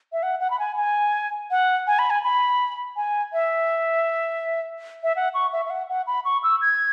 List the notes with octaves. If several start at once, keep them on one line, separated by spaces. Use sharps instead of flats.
E5
F#5
F#5
B5
G#5
G#5
F#5
G#5
B5
G#5
B5
G#5
E5
E5
F#5
C#6
E5
E5
F#5
F#5
B5
C#6
E6
G#6